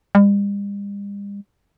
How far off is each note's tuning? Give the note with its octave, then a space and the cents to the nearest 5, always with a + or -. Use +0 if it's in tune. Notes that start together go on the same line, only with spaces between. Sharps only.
G3 +45